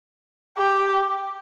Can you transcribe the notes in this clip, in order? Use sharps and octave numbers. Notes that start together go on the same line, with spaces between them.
G4